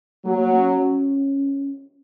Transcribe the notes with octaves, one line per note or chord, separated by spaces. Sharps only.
F#3 A#3
C#4